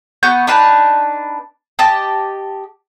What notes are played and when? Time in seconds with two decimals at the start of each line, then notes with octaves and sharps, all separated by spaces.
0.23 B3 F#4 C#6 G6
0.47 D4 D#4 B4 A5
1.79 G4 D#5 A5